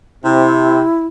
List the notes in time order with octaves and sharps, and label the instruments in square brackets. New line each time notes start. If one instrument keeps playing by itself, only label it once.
[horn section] C3 [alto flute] E4